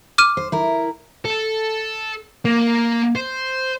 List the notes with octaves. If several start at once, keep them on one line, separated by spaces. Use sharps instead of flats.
D6 F6 D#7
C5
E4 A#4
A4
A#3
C5